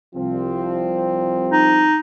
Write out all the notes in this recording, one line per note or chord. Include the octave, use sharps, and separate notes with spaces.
C2 F3 C4
D#4